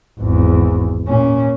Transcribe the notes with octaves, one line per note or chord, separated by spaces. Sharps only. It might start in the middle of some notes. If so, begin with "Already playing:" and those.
G#1 E2
A#2 C#4